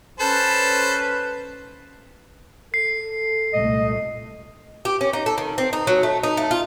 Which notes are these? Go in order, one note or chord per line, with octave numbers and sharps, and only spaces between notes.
C#4 A4 B4 C5 A5
A4 C7
C2 A#2 A3 D#5
G4
C#4
D#4
A4
D#3
C4
D#4
F#3
A3
D#4
A3
F4